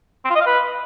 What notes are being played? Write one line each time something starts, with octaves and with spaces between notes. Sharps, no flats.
C4
F4
D#5
F5
B4